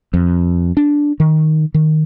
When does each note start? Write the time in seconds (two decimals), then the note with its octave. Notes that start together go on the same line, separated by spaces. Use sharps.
0.14 F2
0.77 D4
1.20 D#3
1.74 D#3